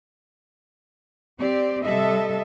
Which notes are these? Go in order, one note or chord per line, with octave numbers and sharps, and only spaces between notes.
C4 G4 D5
C3 G3 A4 D#5 E5